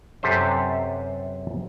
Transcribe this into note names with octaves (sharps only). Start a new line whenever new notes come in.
F#2 C3 G4 A4 B4 C5